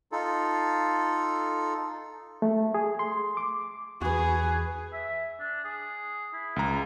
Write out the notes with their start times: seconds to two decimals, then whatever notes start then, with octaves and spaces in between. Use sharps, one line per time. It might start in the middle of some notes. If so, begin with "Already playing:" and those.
0.12 D#4 F4 A4
2.42 A3
2.74 G#4
2.99 C6
3.37 D6
4.01 E2 F#4 G#4 B4
4.93 E5
5.40 D4
5.64 G#4
6.33 E4
6.56 C#2 A#5